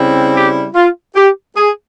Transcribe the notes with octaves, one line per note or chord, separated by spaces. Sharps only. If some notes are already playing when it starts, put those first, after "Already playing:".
Already playing: C#3 G3 C4 E4
G4
F4
G4
G#4